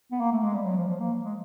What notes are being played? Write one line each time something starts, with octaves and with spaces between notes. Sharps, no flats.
B3
A#3
A3
G#3
G3
F#3
F3
F3
A#3
G#3